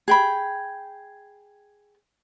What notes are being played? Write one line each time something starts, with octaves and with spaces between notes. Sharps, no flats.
G#4 G5 B5